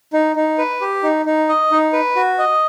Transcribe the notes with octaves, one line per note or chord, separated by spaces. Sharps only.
D#4
D#4
B4
G4
D#4
D#4
D#5
D#4
B4
F#4
D#5